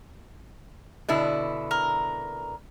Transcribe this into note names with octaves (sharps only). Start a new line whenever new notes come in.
B2 D3 E4
A#4